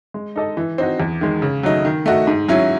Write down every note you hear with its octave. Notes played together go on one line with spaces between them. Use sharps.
G#3
D#4 A4 D#5
E3
C4 D#4 F#4
E2
D#3 G#3
C#3
F#3 A3 D#4
D#3
A3 D#4 F#4
G#2
F#3 C#4 E4